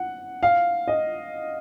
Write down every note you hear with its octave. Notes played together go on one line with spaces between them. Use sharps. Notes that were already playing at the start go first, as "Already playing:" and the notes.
Already playing: F#5
F5
D#5